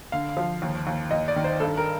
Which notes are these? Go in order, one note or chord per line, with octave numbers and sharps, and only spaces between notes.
D3 F5
F3
D#2
D#2
D#2 D#5
D5
D#3
C5
G2 A4
A#4